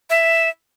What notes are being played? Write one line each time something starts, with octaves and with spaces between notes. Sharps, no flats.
E5